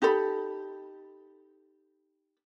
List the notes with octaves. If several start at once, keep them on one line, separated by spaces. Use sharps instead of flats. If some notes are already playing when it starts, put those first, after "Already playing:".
D#4 G4 A4 B5